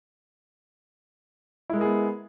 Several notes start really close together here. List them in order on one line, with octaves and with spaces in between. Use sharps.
E4 G#3 A#4 G#4 B3